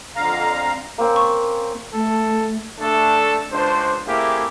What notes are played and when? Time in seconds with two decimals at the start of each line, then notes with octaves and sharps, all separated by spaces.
0.16 F2 D3 F5 A#5
0.98 A#3 C4 C#4
1.16 C#6
1.94 A3 A4
2.79 A3 D4 A4
3.51 C#2 D4 C5
4.06 A3 A#3 C4 E4 G4 G#4